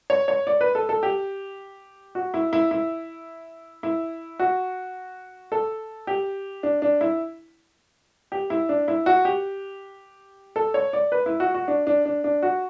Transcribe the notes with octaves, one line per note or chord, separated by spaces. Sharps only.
C#5
C#5
D5
B4
A4
A4
G4
F#4
E4
E4
E4
E4
F#4
A4
G4
D4
D4
E4
G4
E4
D4
E4
F#4
G4
A4
C#5
D5
B4
E4
F#4
F#4
D4
D4
D4
D4
F#4